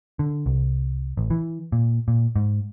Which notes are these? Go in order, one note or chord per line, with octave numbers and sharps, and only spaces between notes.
D3
C2
A1
E3
A#2
A#2
G#2